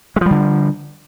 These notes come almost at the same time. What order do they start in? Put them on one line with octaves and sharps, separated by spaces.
G#3 F3 G3 D3